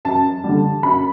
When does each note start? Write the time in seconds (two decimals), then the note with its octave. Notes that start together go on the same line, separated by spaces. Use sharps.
0.05 F#2 A5
0.44 D3 G3
0.83 F#2 B5